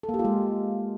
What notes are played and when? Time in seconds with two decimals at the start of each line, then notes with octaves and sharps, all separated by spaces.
0.03 A4
0.09 A#3
0.14 G4
0.19 F4
0.24 G#3